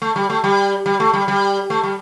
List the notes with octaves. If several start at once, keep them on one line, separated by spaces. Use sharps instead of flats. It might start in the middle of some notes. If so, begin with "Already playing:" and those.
A3
G3
A3
G3
G3
A3
G3
G3
A3
G3